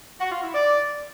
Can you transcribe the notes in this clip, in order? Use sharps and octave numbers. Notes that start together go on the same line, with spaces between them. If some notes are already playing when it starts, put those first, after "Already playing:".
F#4
F4
E4
D5